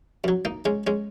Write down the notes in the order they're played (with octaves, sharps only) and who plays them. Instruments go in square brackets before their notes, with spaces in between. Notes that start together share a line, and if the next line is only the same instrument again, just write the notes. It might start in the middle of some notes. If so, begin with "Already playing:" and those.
[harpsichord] F#2 F#3
A#3 D#4
G#3 C#4
G#3 C#4